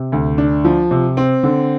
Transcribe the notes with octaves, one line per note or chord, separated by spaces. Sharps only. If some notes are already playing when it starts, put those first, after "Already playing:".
Already playing: C3
D2
D4
F3
C3
C4
D3